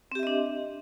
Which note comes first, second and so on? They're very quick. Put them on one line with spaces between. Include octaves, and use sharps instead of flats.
C4 G4 E5 D#5 D4